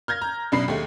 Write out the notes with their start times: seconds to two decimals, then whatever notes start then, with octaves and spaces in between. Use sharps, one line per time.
0.08 F6 G6 G#6 A#6
0.22 A#5
0.52 F#2 B2 D4 B5 C7
0.68 D#2 G#3 A3